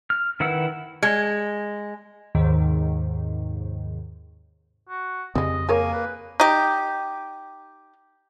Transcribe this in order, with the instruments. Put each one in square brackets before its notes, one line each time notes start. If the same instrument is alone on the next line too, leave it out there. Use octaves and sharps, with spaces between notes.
[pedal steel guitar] F6
D#3 E4 B4 F#5 E6
[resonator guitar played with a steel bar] G#3
[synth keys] D#2 G#2 C3 D#3
[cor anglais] F#4
[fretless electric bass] F2 C#3 C4 [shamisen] G3 G#3 [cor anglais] D#5
[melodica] A#3 [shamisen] G#4 A#4 C#5 [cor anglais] G#5
[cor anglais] B4
[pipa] D#4 G4